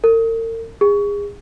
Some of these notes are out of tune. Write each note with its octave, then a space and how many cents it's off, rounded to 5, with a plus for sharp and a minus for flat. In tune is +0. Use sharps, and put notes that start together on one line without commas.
A#4 -45
G#4 -30